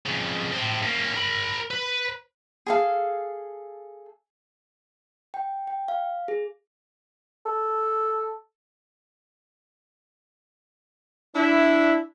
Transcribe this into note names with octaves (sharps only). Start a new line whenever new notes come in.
F2 C#3
A2 C4
A#3 C#4
A#4 B5
B4
G#4 A4 F5
G5
G5
F5
G#4
A4
D4 E4